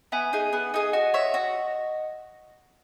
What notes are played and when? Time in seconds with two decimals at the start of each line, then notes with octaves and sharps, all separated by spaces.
0.12 B3 E5 G#5
0.33 D#4 G#4
0.53 B3
0.74 D#4 G#4
0.93 F#4 D#5 F#5
1.14 C#5 E5
1.34 F#4